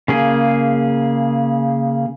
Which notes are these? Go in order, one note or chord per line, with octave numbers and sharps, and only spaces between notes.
C#3 A#3 G#4